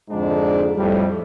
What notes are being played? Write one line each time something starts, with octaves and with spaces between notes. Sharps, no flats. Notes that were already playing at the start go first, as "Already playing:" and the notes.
F2 G#2 D3 G#3 D4
F2 A2 G3